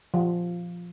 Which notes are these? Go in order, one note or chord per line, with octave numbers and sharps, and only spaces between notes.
F3